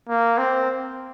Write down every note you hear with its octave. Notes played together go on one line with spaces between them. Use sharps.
A#3
C4